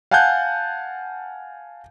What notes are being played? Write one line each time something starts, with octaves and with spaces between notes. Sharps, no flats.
F5 F#5 G#5 A5 F#6 G6